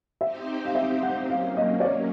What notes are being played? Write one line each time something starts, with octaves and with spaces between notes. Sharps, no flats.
C4 D#4 G4 C5 E5
F5
E5
F#5
F#3 A#3 C#4 F5
D#5
D5
C#5